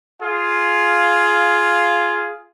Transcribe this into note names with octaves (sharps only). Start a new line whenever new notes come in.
F4 G#4 F5